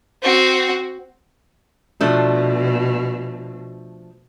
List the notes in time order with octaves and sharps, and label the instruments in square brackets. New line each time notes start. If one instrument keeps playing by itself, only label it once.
[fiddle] C4 F#4
[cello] B2 [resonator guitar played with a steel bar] F3 A3 D4